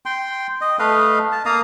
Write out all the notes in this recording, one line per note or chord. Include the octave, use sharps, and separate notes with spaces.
G5 C6
D#5
A3 B4 D#5 F5
A5
A#3 F5 A#5 D#6